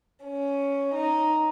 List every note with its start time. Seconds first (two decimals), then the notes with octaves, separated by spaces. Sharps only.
0.23 C#4
0.95 D#4